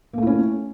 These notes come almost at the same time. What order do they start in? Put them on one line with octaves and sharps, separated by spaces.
A#3 A3 E4 C#4